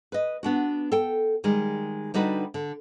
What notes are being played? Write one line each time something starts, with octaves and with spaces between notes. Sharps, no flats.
B4 D#5
B3 D4 F#4
A4 G5
D#3 G3 G#3
D3 G3 D#4 F#4 B4
D3